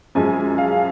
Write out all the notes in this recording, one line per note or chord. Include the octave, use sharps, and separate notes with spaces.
F#2 F3 G#3 G#5
F5